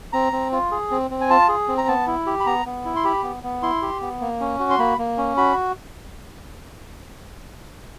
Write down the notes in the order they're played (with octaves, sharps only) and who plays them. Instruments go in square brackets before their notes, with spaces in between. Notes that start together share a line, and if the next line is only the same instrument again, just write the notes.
[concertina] C4 A#5
C4
F4
G#4
C4
C4
G#5
F4 A5
G#4
C4
A#5
B3 A5
E4
G4
B5
B3 A#5
B3
E4
C6
G4 B5
B3
B3
E4 C6
G4
B3
A#3
C#4
F#4
C6
A#3 B5
A#3
C#4
F#4 B5